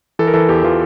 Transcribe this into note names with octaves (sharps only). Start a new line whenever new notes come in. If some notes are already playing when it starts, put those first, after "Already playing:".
E3 A4
A#4
E3 A4
E2 G4
E3 F4